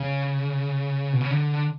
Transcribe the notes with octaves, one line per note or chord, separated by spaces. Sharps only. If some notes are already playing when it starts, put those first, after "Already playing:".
Already playing: C#3
B2
C#3
D3